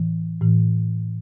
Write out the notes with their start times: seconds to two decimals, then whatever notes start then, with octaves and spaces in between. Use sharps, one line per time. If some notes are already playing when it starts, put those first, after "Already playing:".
Already playing: A2 E3
0.41 A2 E3